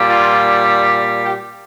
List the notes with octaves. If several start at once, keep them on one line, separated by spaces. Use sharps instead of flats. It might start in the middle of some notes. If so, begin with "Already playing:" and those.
Already playing: A#2 G3
F4
G4